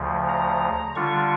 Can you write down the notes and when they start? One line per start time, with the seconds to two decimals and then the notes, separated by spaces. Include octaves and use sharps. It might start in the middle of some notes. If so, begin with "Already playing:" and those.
Already playing: D2 C#3 F3
0.29 A#5
0.96 D3 G3 D4 F4 C#6